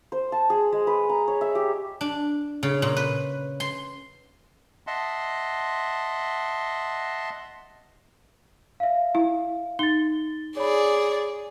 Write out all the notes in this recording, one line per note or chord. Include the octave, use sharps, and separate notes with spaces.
C5
A5
G#4
G#3
B4
A#5
C#5
E5
G4
D4
C#3
A#2
B4
C6
D#5 E5 F#5 A5 C6
E5 F5
E4
D#4 A6 G7
G#4 C#5 D5 B5